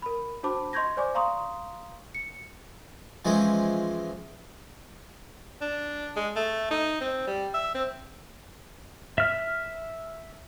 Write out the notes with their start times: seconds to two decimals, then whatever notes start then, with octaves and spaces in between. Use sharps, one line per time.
0.02 A#4 B5
0.43 D4 F#4 C5 A5 B5 D6
0.73 D#5 C6 C#6 G6 G#6 A#6
0.97 C5 D5 G#5 C#6 D6
1.15 F5 A#5 C6 C#6 D#6
2.15 C#7
3.25 E3 F3 G#3 C4 C#4 G#4
5.61 D4
6.16 G#3
6.36 A3
6.71 D#4
7.01 C4
7.27 G3
7.54 E5
7.75 C4
9.18 E5 F6